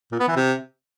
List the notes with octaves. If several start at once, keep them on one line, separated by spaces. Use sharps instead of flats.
A#2
B3
E3
C3